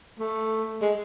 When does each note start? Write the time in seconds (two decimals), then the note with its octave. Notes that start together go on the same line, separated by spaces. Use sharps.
0.19 A3
0.81 G#3